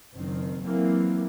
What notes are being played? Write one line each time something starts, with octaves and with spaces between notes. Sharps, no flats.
F#1 D#3 C4
E3 F#3 A#3 C4